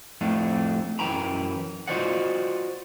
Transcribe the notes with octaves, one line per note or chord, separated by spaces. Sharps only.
F2 A2 A3 D4
F#2 E3 G5 A#5 B5
F4 F#4 C5 D5 D#5 F#5